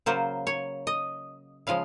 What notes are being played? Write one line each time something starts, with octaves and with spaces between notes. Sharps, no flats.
C#3 F#3 A#3 C5
C#5
D#5
C#3 F3 G#3 F5